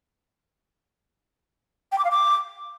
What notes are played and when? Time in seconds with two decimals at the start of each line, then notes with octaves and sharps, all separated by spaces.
1.92 G5
1.98 D6
2.05 F5
2.11 D6